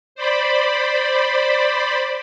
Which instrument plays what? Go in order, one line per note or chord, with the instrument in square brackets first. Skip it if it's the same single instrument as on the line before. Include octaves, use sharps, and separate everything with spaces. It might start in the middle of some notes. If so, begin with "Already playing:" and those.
[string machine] C5 D5 B5